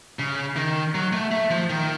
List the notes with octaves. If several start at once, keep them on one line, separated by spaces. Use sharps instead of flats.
C#3
D#3
F#3
A3
A3
F3
D#3